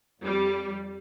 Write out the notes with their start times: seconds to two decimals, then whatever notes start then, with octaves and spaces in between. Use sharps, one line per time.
0.22 F2 G3